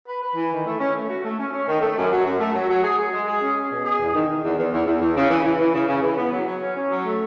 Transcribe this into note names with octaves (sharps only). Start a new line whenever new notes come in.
B4
B4
E3
D#3
A3
C#4
A3
F#4
A3
C#4
C#4
D#3
A3
F#2
F#3
F#2
A3
F#3
F#3
G#4
G#4
G#3
G#4
C#4
G#4
B2
G#4
E2
D#3
D#3
E2
E2
E2
E2
E2
C#3
E3
E3
E3
C#3
C#3
E3
B3
F#3
F#3
C#4
C#4
F#3
A3